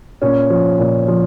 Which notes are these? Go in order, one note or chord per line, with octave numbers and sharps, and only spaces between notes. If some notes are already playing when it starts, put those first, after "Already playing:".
A#2 C#4
F3
A#2
F3